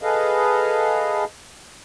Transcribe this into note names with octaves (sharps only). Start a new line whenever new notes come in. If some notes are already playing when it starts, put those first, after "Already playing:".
G#4 A4 B4 D#5 F5